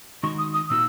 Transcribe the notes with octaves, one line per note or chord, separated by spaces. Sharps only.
D#3 G#3 D#4 F#4 C#6
D#6
D#6
A#2 A#3 D#4 F#4 E6